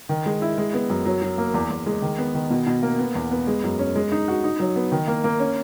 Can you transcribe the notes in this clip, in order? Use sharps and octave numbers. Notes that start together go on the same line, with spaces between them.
D#3
G#3
E4
G#3
B3
F#2
F#3
F#3
A#3
E2
E2
G#3
D#3
B3
D#3
B2
B2
A#3
B3
E2
B3
G#3
F#2
C#4
G#3
D#4
F#4
D#4
F#3
B3
D#3
A#3
A#3
C#4